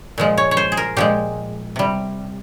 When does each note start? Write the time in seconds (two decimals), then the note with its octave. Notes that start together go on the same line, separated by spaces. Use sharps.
0.18 A#2 F3 G#3
0.38 C#5
0.51 C#5
0.57 C5
0.72 G#4
0.77 A#4
0.96 A#2 F3 G#3 G4
1.76 C3 G3